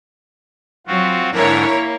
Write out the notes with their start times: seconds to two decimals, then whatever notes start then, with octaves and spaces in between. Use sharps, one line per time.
0.87 F#3 C4 F4 F#4
1.32 G#2 D3 A#3 E4 A#4 C#5
1.66 A#3